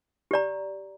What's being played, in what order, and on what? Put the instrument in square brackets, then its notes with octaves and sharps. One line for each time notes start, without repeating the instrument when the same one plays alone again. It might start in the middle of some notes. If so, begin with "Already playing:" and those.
[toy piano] G4 D5 A#5